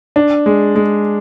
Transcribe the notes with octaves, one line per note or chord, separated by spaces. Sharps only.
D4
G#3
G#3